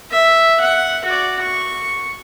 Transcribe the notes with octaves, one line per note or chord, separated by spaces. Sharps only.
E5
F#5
F#4 D5
C#6